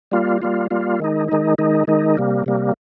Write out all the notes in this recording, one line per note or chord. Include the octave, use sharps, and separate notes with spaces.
G3 A#3 F4
G3 A#3 F4
G3 A#3 F4
D#3 G#3 D#4
D#3 G#3 D#4
D#3 G#3 D#4
D#3 G#3 D#4
C3 G3 A#3
C3 G3 A#3